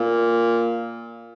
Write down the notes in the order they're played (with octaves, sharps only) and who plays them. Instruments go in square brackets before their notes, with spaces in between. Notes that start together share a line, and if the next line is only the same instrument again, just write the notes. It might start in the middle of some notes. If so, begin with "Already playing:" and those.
Already playing: [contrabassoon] A#2